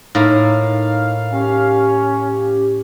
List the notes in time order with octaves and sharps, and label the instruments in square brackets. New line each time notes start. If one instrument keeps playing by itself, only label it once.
[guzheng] A2 A#3 [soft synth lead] D#4 [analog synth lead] F5
[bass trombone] C#4 [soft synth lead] G4